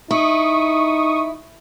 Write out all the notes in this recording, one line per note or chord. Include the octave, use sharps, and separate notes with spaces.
D#4 E4 C#6 D#6